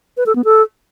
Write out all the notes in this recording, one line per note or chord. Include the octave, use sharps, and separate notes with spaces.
B4
A4
B3
A4